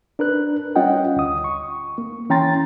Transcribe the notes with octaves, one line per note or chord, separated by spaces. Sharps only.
D4 A#4 B4 F#6
G3 C#4 F4 D#5 F#5 G5
D2 D#6
C#6
A#3
E3 C#4 G5 A#5 C6 A6